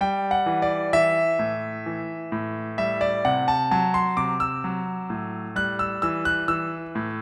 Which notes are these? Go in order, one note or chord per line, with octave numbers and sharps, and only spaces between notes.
G3 G5
F#5
E3
D5
E3 E5
A2
E3
A2
G3 E5
D5
C3 F#5
A5
F#3 A5
C6
C3 D6
E6
F#3
A2
G3 F#6
E6
E3 E6
F#6
E3 E6
A2